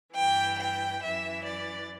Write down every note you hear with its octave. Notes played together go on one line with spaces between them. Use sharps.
G2 E3 G5
G5
F#2 E3 E5
D5